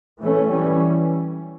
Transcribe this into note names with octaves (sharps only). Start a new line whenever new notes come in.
E3 A3 C#4
E3 G3 C#4